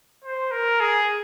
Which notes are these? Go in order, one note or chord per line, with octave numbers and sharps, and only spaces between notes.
C5
A#4
G#4